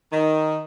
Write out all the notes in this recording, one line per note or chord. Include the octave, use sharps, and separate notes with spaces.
D#3